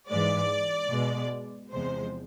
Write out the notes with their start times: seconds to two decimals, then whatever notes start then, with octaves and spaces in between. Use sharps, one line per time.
0.09 G#2 E3 G#3 D5
0.91 B2 G#3
1.72 E2 C3 F3 G#3 C5